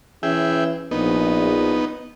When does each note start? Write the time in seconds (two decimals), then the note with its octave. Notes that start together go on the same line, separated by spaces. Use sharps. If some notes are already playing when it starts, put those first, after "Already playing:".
0.23 E3 C#4 G#4 E5 G5
0.91 A#1 B3 D#4